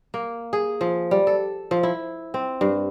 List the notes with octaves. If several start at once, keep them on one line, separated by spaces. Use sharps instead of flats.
A#3
G#4
F3
G3
A4
F3
E4
C4
G2